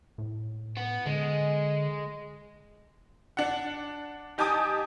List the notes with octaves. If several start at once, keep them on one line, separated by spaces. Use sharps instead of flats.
A2
B3
D3 G#3
D4 F#5
D#4 G4 G#5 A5 D6 D#6